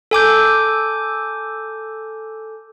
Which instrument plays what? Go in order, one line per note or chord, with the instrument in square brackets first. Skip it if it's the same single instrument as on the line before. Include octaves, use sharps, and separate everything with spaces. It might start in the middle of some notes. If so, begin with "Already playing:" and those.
[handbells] A4 G#5 D6 G6